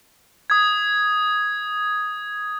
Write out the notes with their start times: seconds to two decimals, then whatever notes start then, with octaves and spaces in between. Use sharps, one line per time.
0.50 D#6 G#6